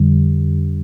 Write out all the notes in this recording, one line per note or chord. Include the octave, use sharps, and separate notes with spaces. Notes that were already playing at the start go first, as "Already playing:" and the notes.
Already playing: F2 D3 G3